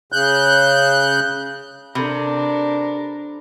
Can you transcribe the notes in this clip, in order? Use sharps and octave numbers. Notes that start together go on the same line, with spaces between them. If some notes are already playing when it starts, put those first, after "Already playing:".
C#3 F#6 G6
C3 D4 A4 A#4 B5